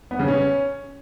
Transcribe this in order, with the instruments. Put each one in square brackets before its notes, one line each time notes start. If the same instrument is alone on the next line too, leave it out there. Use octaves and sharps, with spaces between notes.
[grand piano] B3
C#3
C#4